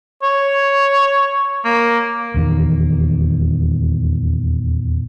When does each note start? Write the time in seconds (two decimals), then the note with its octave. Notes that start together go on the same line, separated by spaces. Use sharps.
0.23 C#5
1.64 A#3
2.34 D#1 E2 D#3